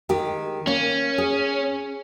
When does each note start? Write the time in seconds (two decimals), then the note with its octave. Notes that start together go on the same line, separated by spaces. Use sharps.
0.09 D#3 G#3 G4
0.67 A#3 C#4
1.18 G#4